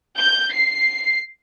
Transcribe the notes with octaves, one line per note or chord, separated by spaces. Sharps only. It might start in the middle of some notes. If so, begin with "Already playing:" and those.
G6
C7